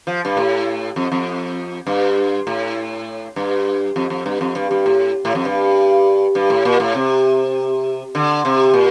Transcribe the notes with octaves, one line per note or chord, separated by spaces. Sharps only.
F3
G2
A2
F2
F2
G2
A2
G2
F2
F2
G2
F2
G2
G2
A2
A2
F2
G2
G2
A2
A#2
A2
C3
D3
C3
A#2